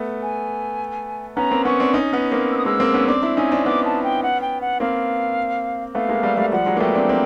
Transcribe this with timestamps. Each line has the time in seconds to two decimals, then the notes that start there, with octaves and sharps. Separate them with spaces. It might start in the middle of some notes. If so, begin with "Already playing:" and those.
Already playing: A3 B3
0.22 G#5
1.36 B3 C#4 A#5
1.51 A#3 C4
1.65 B3 C#4 C#6
1.80 C4 D4
1.94 C#4 D#4
2.13 B3 C#4
2.32 A#3 C4
2.52 E6
2.58 D#6
2.65 G#3 A#3 E6
2.80 A#3 C4
2.94 B3 C#4
3.08 C4 D4 D6
3.22 D4 E4
3.37 C#4 D#4 G#5
3.52 C4 D4
3.66 B3 C#4 D6
3.85 A5
4.04 G5
4.23 F#5
4.41 G5
4.61 F#5
4.80 A#3 C4 F5
5.94 A3 B3 F5
6.09 G#3 A#3
6.23 G3 A3
6.37 G3 A3
6.52 F3 G3 F#5
6.66 F#3 G#3
6.77 A#3
6.80 A3 B3 G5
6.95 C4 D4
7.09 A#3 C4